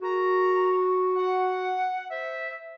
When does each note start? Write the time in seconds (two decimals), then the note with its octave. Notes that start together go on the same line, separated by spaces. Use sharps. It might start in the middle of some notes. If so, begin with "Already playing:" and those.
0.02 F#4 G#4 A#4 A#5
1.16 F#5
2.10 C5 E5